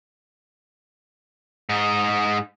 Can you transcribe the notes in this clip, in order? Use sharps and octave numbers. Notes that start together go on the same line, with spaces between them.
G#2 D#4